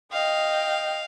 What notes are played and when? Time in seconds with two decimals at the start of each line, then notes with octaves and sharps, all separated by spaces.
0.13 D#5 F5 G5